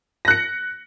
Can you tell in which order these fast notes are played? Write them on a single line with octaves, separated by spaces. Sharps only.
A#6 F#6 C#7